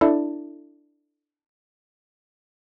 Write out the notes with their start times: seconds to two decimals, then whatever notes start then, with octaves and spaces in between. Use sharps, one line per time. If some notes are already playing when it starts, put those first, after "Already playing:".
0.01 D4 E4 A4